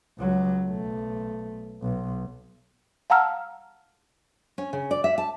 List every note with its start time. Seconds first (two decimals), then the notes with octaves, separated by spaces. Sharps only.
0.19 C#2 F#3
0.66 B1 A3
1.82 B1
3.10 F5 F#5 A5 A#5 E6 F6
4.58 C#4
4.73 C#3
4.91 D5
5.04 E5
5.18 A5